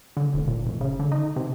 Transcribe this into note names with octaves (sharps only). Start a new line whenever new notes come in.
D3
F1
A#2
F1
C#3
D3
D#4
C3